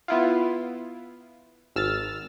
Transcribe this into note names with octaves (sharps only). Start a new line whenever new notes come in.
B3 E4 F4
G#1 E6 F6 A6